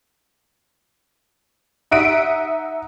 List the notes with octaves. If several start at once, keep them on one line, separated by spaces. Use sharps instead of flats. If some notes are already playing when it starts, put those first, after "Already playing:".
D#4 E5 F#5 D7 D#7